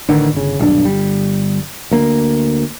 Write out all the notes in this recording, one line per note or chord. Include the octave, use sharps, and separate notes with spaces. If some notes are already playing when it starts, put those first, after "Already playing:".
A1 D3 D#3
G1 C#3
D#1 B1 G2 D4
G1 G3
D2 A#3